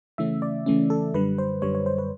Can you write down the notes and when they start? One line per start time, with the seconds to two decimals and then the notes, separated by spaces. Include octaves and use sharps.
0.18 C#3 E3 A3 C#4 E5
0.42 D5
0.66 C#3 E3 A3 C#4
0.90 A4
1.14 F#2 D3 G3 B4
1.38 C5
1.62 F#2 D3 G3 C#5
1.75 C#5
1.86 C5
1.98 B4